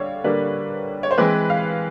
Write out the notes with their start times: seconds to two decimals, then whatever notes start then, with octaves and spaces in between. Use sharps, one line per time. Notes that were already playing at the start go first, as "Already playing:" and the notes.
Already playing: D3 G3 C#5 F5
0.24 D3 G3 A#3 B4
1.03 C#5
1.11 C5
1.18 E3 G#3 C4 B4
1.50 F5